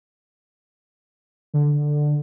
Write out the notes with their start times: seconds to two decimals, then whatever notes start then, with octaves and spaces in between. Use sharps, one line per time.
1.54 D3